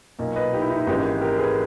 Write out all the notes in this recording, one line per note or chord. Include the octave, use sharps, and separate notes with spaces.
B1 A#2 A#3
B4 D#5
D#4 G4
E4
D#4
E4
G#1 G#2 E3 A#3 C#4 D#4 G4
G4 A#4
G#4 B4